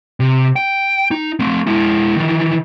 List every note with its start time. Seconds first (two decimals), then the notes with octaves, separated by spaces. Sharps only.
0.20 C3
0.56 G5
1.11 D#4
1.39 A3 C4
1.67 G#3 E4
2.17 D#3 E3